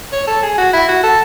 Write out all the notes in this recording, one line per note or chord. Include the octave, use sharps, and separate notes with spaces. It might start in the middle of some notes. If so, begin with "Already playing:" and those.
C#5
A4
G#4
F#4
E4
F#4
A4